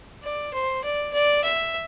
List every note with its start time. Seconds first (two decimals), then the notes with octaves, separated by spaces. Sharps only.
0.23 D5
0.53 C5
0.84 D5
1.13 D5
1.44 E5